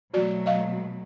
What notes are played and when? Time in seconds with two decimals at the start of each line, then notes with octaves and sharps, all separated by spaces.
0.14 B2 F#3 A3 F#4 D5
0.46 D#5 F5